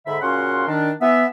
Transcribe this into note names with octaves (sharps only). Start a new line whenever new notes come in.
G#2 D3 E5 B5
A#2 C#3 C#4 F#4 F#5 C6
D#3 D4
E3 B3 E5